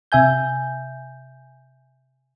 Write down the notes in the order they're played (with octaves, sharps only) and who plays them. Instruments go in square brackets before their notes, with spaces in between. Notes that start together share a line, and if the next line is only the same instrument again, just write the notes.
[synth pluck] C3 E5 G#5 G6